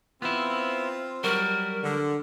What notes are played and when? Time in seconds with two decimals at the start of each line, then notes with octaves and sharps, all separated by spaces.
0.22 B3 C4 E4 F4
1.24 F#3 G3 F#4 A#4
1.83 D3